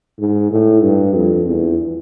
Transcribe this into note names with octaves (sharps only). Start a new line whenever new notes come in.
G#2
A2
G2
F2
E2